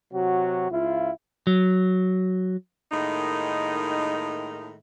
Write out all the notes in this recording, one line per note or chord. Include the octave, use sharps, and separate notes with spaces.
C3 F#3 F#4
C#2 E4 F4
F#3
A2 D#3 G#3 A#3 D#4